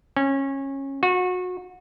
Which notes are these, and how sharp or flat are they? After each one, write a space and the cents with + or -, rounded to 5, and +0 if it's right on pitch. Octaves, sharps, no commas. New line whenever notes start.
C#4 -20
F#4 -30